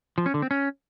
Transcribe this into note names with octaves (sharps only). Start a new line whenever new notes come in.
F3
C#4
D3
C4
C#4